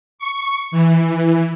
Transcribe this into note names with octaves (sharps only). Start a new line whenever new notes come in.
C#6
E3